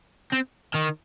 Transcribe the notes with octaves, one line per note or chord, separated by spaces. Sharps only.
C4
D#3